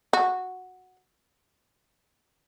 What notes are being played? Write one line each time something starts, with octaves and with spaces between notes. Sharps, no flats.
F#4